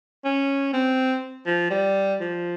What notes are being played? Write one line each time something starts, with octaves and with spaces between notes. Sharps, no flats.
C#4
C4
F3
G3
F3